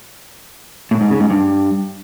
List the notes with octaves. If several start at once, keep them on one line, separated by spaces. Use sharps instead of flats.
A2
G#2
C#3
G#2
G2